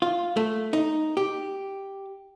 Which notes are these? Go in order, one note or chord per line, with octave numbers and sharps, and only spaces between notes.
F4
A3
D#4
G4